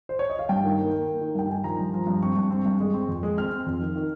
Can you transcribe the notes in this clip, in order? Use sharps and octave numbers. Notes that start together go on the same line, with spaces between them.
C5
C#5
D#5
F5
G2 G5
D#3
A#3
A#3
A#3
D#3
G2 G5
D#3 G#5
F3 A#5
G2
F3
G2
C4 C#6
G2
C4
G2
G#3
C4
F2
G#3
C4 F6
C4
F2
D#3
D#3